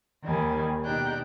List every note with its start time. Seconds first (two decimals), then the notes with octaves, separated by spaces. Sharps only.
0.23 D#2 D#3 G3 G#5
0.85 B2 D4 D#4 G4 G5 F#6